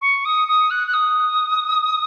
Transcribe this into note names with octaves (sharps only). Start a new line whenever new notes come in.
C#6
D#6
D#6
F#6
F#6
D#6